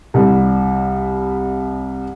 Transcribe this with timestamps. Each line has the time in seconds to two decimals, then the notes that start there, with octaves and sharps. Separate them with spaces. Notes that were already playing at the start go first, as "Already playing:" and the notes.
0.14 C2 G3